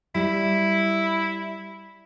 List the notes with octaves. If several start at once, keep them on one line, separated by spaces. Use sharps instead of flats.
G3 E4